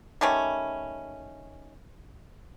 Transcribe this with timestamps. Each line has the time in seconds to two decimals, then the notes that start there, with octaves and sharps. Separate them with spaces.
0.21 D#3 G3 A3 C#4